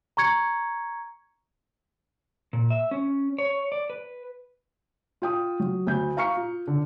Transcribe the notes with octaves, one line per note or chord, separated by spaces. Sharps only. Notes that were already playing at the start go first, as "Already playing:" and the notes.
A#5 C#6 G#6 C#7
A#2
E5
C#4
C#5
D5
B4
F4 G5 D#6
F#3
D2 G6
F5 A#5 C#6 F6 C#7
F4
D3